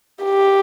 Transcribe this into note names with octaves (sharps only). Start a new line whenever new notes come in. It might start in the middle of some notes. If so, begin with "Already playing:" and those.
G4